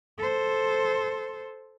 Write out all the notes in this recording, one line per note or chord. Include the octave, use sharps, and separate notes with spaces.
A4 C5